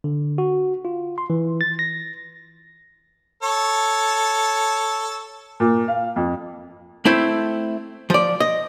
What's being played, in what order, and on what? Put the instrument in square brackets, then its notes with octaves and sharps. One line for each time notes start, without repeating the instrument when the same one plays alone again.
[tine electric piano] D3
F#4
F4
C6
E3
A6
A#6
[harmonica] A4 C#5
[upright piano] A#2
F5
F2
[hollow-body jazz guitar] A3 C4 E4
F3 D5
D#5